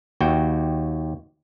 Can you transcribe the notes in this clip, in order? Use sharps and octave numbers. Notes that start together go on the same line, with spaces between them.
D#2 F#4 G5